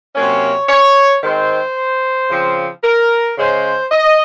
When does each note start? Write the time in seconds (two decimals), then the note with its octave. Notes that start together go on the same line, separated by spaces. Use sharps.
0.15 C3 F#3 A#3 C#4 C#5
0.69 C#5
1.23 D#3 G#3 C4 C5
2.30 C#3 F3 C4
2.84 A#4
3.37 C#3 G#3 C#4 C5
3.91 D#5